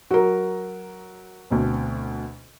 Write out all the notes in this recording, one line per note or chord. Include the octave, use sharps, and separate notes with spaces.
F#3 F#4 A#4 A#5
D2 B2 C4